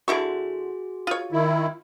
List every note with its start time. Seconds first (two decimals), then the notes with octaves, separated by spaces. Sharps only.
0.08 D3 E4 F#4 G#4 C#6
1.07 F4 C#5
1.32 D#3 E4